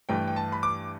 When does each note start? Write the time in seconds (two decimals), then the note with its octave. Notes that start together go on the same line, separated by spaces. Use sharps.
0.09 G2 E3 A3 G5
0.27 G5
0.36 A5
0.52 B5
0.63 D6